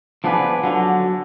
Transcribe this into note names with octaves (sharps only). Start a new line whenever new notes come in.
F3 B3 D4 G#4 B4
D3 F#3